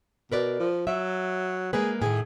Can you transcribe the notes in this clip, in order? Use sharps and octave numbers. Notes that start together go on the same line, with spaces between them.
B2 A#4 B4 D5
F3
F#3 E5
G#3 A#3 G#4 B4
A2 D#3 G#4